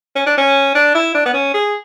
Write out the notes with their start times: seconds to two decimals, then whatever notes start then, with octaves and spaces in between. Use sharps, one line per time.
0.16 C#4
0.26 D4
0.38 C#4
0.75 D4
0.95 E4
1.14 D4
1.25 B3
1.34 C#4
1.54 G#4